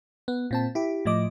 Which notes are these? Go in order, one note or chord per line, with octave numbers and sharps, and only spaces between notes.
B3
A#2 C4 A5
E4 G4
A2 F3 D#5 D6